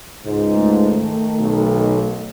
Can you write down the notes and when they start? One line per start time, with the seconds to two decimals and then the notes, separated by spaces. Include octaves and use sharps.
0.25 C#2 G#2
0.53 A3
0.89 D#3
1.40 B1